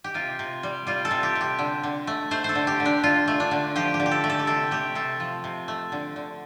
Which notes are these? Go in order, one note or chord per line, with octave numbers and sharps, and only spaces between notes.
G4
C3 F4
C3
G3
G3 F4
A4
C3
G4
C3
G4
D3
D3
A3
A3 C5
A4 C5
D3
G4
D3
D4
D3 F4
A3
D4
D3
F3 G4
G4
D3
G4
A4
A3
A4
G4
C3 A4
A3 G4
C3 A4
F3
C3
A3
D3
D3